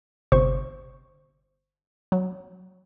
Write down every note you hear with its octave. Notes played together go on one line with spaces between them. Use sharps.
G1 C3 C5 C#6
F#3